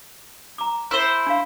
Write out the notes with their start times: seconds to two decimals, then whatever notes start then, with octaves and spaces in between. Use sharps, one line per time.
0.58 A#5 D6
0.91 E4 C5
1.27 D4 F5